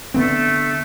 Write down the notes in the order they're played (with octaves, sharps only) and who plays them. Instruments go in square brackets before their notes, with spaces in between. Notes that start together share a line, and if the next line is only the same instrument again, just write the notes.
[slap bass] D3 B3 C4 [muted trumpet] A3